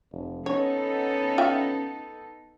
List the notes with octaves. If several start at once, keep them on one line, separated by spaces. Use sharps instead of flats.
F1
B3 C#4 D#4 A4 C#5
F4 E5 G5